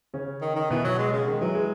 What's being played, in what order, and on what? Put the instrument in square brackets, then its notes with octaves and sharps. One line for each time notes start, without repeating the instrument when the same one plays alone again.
[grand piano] C#3 C#4
[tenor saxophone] D#3
D#3
[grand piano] B2 B3 [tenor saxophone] E3
[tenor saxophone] F#3
G#3
C#3
[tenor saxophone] D#3 [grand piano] G#3
[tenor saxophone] E3 [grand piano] F#3
[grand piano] G#3